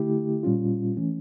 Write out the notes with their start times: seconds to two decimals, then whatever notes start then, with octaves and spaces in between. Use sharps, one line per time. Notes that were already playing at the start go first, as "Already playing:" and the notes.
Already playing: D3 A3 E4 G4
0.43 A#2 G3 C#4 F4
0.97 E3 A3 C#4